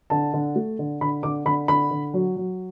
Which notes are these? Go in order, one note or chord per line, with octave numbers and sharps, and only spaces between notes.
D3 A5
D3
A3
D3
D3 B5
D3 D6
D3 B5
D3 B5
D3
F#3
F#3